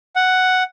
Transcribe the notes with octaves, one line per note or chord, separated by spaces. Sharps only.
F#5